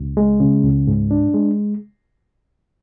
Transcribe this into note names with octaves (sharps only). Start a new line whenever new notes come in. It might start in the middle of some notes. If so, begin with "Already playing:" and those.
Already playing: C#2
G#3
C#3
C#2
G#2
D4
G#3